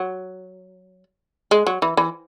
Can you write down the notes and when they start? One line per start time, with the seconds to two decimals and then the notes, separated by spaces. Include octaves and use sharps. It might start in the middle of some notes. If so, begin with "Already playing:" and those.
Already playing: F#3
1.51 G#3
1.67 F#3
1.82 E3
1.97 E3